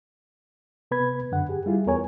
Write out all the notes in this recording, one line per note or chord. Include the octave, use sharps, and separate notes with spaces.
C3 B3 B4 B5 G#6
F#2 D3 F#5
G4 G#4
G3 E4 F4 G#4
E2 B3 A#4 C#5 G#5